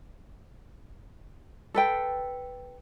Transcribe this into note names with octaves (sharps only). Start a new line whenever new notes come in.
A4 B4 G5